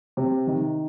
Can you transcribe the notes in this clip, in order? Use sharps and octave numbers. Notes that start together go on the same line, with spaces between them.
C3
D#3